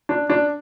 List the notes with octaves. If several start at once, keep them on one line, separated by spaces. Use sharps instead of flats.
D4
D4